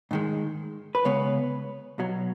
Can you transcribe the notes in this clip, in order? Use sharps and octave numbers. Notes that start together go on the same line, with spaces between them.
G#2 D#3 G#3
B4
C#2 C#3 G#3 B3 C#5
B1 B2 F#3